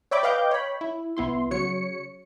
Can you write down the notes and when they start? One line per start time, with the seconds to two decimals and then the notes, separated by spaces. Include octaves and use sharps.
0.11 C#5 D5 E5 G5 B5 D6
0.23 B4 D#5 F5 G5 D6 G6
0.51 C#5 B5
0.81 E4
1.17 C2 B3 E4 C6
1.51 C#3 F#3 C#5 C#7